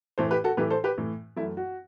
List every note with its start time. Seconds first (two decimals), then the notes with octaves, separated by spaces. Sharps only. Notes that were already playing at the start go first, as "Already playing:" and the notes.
0.18 A2 E3 A3 A4 C5
0.31 G4 B4
0.44 F#4 A4
0.57 A2 E3 A3 G4 B4
0.70 A4 C5
0.84 G4 B4
0.98 A2 E3 A3
1.36 F#2 E3 A3 E4
1.57 F#4